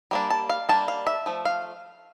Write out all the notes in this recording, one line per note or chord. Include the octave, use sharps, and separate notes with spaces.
G3 A#3 D4
A5
F5
G3 A#3 D4 A5
F5
E5
F3 A3
F5